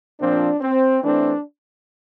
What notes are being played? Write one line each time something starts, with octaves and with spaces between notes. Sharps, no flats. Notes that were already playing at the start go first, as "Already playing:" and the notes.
A#2 F3 C4 D4
C4
E3 A3 C4 D4